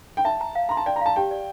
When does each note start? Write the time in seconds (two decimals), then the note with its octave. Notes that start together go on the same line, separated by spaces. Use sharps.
0.17 G5
0.25 E5 A5
0.41 A#5
0.55 F5
0.69 A#5 C6
0.77 A5
0.86 D5 G5
0.96 A#5
1.01 F5 A5
1.16 G4 G5
1.31 D5